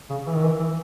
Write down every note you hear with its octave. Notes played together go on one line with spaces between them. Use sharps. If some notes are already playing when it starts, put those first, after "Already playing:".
C#3
E3
D#3
E3
E3